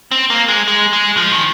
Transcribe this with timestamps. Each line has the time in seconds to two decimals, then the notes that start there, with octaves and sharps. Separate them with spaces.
0.11 C4
0.30 A#3
0.48 G#3
0.68 G#3
0.93 G#3
1.17 F3
1.32 D#3